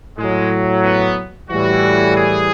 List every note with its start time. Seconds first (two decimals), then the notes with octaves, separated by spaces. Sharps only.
0.18 A2 F#3 G#3
0.83 B3
1.50 A2 E3 G3 F#4
2.16 G#4